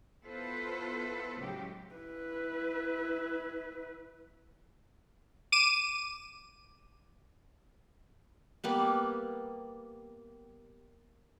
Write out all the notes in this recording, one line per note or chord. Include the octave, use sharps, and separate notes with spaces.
B3 E4 F4 A4 B4 C5
A2 C#3 F#3 G#3 G4
E4 B4
D6 D#7 E7
G3 A#3 B3